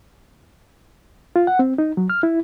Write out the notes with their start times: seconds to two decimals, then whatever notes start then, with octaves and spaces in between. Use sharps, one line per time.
1.36 F4
1.47 F#5
1.59 C4
1.78 D#4
1.97 F#3
2.10 F6
2.23 E4